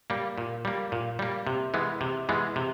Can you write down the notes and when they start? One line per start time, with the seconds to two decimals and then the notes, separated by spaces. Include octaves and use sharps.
0.10 G3 A#3
0.38 A#2
0.65 G3 A#3
0.92 A#2
1.19 G3 A#3
1.47 C3
1.74 E3 G#3 B3
2.01 C3
2.29 E3 G#3 B3
2.56 C3